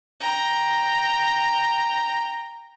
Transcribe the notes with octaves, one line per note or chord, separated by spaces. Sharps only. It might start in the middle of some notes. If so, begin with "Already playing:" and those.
G5 A#5